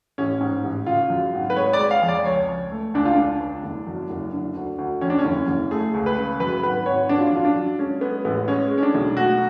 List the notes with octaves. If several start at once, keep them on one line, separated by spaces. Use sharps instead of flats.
A1 C#4
G#2
A1
C#3 F4
F#2
G#1
B4
G#3 C#5
D5
G#3
F5
F2
D5
C#2 C#5
C#2
A3
C#2 D4
F4
C#2 D4
C#2
F#1
F#2
F#1
D3
D2
D2
F2 C#4
D4
C#4
F#1
F#1
A3 G#4
C#2
B4
C#3
F#2 B4
G#1 B4
G#1 C#5
F#3 D4
F4
D4
F#2 F4
D4
F#3
G#3 C#4
G#3 B3
A1 B3
G#3 C#4
G#3
C#4
D4
B1
A3 F#4